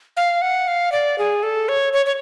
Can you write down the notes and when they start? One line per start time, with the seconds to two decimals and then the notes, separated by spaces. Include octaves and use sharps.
0.17 F5
0.42 F#5
0.68 F5
0.92 D5
1.18 G#4
1.43 A4
1.69 C#5
1.93 C#5
2.06 C#5